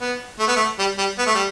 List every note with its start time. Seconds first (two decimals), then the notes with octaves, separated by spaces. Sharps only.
0.01 B3
0.39 A3
0.48 B3
0.56 A3
0.79 G3
0.98 G3
1.18 B3
1.26 A3
1.35 G3